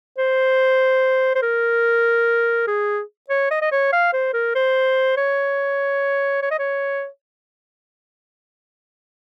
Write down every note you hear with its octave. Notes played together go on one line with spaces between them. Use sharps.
C5
C5
A#4
G#4
C#5
D#5
D#5
C#5
F5
C5
A#4
C5
C#5
C#5
D#5
C#5